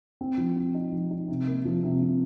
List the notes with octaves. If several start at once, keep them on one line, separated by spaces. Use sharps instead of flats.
C4
F3
C4
D#4
F3
D#4
C3
A#3
F3
C3
C3